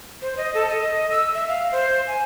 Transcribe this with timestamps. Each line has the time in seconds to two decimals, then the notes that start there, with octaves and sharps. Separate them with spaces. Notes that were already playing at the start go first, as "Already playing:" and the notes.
0.22 C5
0.37 D#5
0.54 A4
0.69 D#5
1.11 E6
1.34 E5
1.48 F5
1.72 C5
2.08 G#5